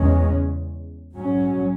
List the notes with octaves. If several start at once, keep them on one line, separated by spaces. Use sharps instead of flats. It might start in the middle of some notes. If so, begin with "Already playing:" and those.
Already playing: E2 C#3 G#3 C#4
G#2 F#3 C#4